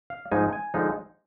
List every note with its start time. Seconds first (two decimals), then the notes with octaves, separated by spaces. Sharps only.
0.10 F5
0.31 G#2 F3 G#3 D#4 G#5
0.53 G#5
0.74 D3 F3 G#3 D#4